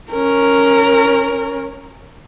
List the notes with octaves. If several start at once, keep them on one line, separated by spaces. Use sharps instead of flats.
C#4 A#4